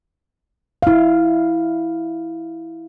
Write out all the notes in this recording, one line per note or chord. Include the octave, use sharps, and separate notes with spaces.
E4 F5